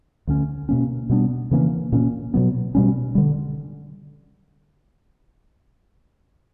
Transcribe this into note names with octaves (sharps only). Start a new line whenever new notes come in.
D2 D3 A#3 C#4
B2 A#3 C#4
B2 G3 B3 D4
C#3 E3 A#3 C#4
A#2 A#3 C#4
B2 F#3 B3
B2 G3 C#4
D3 G3